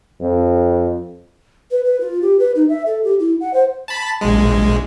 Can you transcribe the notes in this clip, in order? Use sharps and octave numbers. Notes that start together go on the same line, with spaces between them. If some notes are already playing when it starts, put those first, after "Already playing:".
F2
B4
B4
F4
G4
B4
D#4
E5
A4
G4
E4
F#5
C5
A5 B5
A#1 G#3